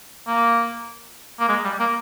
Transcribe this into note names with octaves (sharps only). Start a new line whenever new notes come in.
A#3
A#3
G#3
G3
A#3